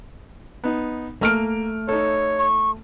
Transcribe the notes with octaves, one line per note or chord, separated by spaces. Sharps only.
B3 D#4
A3 A#3 F6 D7
D#4 A4 C#5
C#6